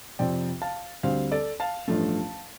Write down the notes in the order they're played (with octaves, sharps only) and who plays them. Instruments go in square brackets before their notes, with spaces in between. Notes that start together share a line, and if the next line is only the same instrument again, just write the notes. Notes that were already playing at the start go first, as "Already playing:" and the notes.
[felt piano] F2 C3 F3 C4 D5 G5
F5 A5
D2 D3 G3 C4 C5 F5
A4 D5
F5 A5
A1 G2 F3 A3